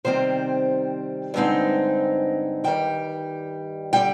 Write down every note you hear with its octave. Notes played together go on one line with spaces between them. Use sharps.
C3 D#3 G3 C4 C5
G2 D3 G#3 C4 D#4
G2 D#3 G3 G5
D3 G3 G5